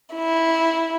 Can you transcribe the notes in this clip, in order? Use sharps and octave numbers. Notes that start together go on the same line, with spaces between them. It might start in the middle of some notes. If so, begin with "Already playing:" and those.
E4